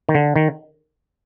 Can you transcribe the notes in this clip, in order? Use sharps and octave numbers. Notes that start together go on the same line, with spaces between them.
D#3
D3
D#3